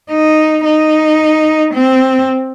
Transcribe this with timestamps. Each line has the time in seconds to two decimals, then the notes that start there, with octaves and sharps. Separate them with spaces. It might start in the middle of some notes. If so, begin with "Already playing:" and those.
0.11 D#4
0.65 D#4
1.74 C4